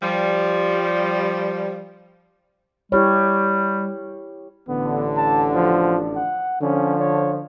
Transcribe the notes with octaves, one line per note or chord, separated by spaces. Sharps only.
F3 G3
G3 E4 G4 C#5
A1 D3 B3
A5
F3
F#5
D3 F3 C#4
C#5